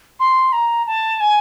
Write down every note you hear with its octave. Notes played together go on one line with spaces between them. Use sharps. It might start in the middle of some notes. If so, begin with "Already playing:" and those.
C6
A#5
A5
G#5